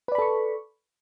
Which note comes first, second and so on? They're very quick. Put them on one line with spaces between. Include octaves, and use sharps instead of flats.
B4 D5 B5 A4 C#6